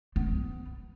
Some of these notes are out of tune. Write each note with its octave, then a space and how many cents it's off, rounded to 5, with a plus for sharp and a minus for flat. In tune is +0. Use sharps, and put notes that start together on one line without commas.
B3 +30